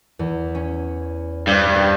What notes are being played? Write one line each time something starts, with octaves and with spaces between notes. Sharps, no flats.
E2
C#4
G2 C5 E6
B3 G4